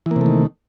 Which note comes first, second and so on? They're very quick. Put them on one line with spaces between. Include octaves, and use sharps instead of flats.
E3 A#3 C3 A3 D#3